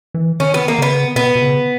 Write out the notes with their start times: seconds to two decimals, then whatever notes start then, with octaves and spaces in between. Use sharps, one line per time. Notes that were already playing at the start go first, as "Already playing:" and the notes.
0.14 E3
0.40 D#3 C#4
0.54 B3
0.68 A#3
0.78 C#3 B3
1.16 B2 B3
1.35 B2
1.42 C#3